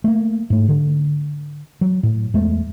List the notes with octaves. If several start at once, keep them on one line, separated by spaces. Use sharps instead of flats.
A3 A#3
G#2 A3
D3
F#3
A2
E2 G#3 A3